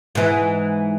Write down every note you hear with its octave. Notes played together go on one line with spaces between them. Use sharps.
G#2 E3